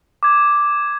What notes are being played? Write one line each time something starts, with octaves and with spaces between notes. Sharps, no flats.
D6 G#6